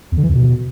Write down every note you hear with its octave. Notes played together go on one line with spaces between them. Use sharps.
E2
D3
E3
E2
B2